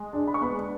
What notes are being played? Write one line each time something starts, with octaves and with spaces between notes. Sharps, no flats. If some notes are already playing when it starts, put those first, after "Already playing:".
Already playing: G#3
D4
B5
C#6
B3 B5